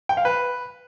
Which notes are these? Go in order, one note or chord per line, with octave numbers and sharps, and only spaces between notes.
G5
F5
B4